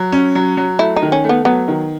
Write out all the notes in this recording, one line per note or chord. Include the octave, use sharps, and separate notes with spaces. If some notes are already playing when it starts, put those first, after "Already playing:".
Already playing: F#3
C#4
F#3
F#3
A3 E4
D#4
D#3
C#4
A3
B3
F#3 B3
D#3